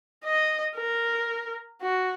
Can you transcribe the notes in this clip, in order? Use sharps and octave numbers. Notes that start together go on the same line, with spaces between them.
D#5
A#4
F#4